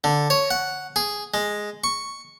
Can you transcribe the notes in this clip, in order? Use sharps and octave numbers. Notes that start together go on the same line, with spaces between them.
D3
C#5
F#5
G#4
G#3
C#6